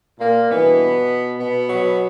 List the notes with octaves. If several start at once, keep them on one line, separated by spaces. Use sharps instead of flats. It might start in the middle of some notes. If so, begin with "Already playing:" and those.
A#2 A#3
G2 B2 E3 B3
B2 B3
B2 F#3